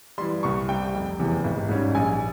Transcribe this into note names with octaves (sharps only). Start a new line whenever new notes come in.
E3 G3 C6
C2 C#6
C3 G3 G5
F1
E2 C3 E3
G#1
G#2 G3 C#4
A#1 G#5